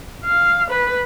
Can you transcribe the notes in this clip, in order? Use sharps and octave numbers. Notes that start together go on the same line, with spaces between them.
F5
B4